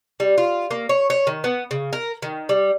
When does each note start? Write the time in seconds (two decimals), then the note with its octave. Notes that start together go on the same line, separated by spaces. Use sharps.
0.20 G3
0.38 F4
0.70 A#3
0.89 C#5
1.10 C#5
1.27 D#3
1.44 B3
1.71 C#3
1.93 A#4
2.22 D#3
2.49 G3